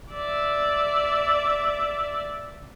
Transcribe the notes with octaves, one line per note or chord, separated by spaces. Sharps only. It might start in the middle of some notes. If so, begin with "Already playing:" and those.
D5 E5